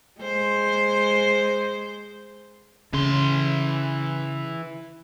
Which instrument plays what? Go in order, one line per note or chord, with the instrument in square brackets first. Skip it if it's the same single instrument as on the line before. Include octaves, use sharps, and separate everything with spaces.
[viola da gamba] G#3 C5
[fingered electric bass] C#3 [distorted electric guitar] E3 C6